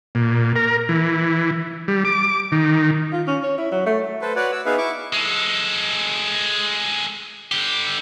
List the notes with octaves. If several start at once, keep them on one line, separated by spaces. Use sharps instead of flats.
A#2
A#4
E3
G3
D6
D#3
F4
C#4
C#5
E4
F#3
A3
A4 B4 C5
F#4 B4 C#5 D5 F#5
F#4 E6
B3 D#4 G#4 B4 E5 F5
E4 C#6 D6
G#3 A4
D3 G4